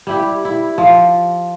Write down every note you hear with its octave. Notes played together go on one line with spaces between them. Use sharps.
G3 E4 G4
E4
F3